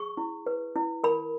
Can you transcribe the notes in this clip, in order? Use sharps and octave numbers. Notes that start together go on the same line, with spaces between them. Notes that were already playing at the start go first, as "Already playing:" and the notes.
Already playing: G#4 C#6
E4
B4
E4
A#4 B5